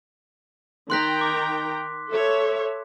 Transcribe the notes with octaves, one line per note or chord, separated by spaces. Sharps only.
D#3 G5 A#5 C6 F#6 B6
D6
A4 C#5 E5